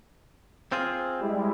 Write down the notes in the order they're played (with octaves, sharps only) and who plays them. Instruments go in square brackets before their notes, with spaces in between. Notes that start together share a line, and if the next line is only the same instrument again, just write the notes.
[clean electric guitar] C4 F4 G#4
[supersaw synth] G3 G#3 E4